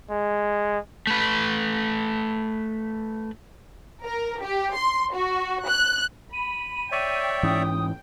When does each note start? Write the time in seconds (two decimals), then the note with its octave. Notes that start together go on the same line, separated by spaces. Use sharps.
0.11 G#3
1.07 A3 B4
4.04 A#4
4.42 G4
4.75 C6
5.14 F#4
5.67 F#6
6.33 B5 D#7
6.92 C#5 D5 E5 G5
7.43 G#2 E3 C#4 D#6